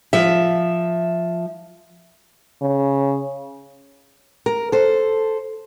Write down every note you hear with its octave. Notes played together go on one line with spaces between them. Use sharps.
F3 E5
C#3
A#4
A4 C5